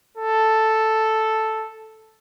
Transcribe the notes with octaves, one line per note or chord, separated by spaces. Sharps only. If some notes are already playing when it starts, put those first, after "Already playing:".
A4